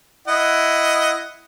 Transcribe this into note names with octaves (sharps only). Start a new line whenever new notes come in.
E4 D#5 F#5